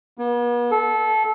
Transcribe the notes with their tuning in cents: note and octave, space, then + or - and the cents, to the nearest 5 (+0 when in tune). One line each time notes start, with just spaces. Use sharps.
B3 -45
A4 -20